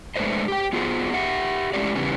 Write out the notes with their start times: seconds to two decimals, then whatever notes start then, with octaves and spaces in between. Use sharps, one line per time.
0.16 G#3 A3 D4 B4 C5 D#5
0.48 G4 G5
0.73 B3 F4 F#4 G#4 C5
1.14 G4 E5 F#5
1.74 G#3 A3 C#4 E4 G4 D5
1.95 C#3 E3 G3 B3 C#4